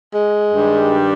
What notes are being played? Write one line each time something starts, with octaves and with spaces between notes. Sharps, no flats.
G#3
G2 D#3 G3